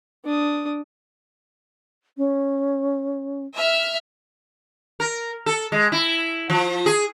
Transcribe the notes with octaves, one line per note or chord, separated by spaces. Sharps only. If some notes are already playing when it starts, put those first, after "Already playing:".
D4 D#6
C#4
E5 F6
A#4
A4
G#3
E4
F3
G#4